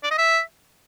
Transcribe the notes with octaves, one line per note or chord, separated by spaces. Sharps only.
D5
D#5
E5